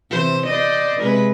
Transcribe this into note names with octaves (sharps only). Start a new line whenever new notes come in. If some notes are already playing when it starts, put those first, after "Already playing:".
C3 E3 C5
C5 D5 D#5
C3 G#3 B4